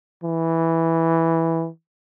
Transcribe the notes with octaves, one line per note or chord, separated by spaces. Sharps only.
E3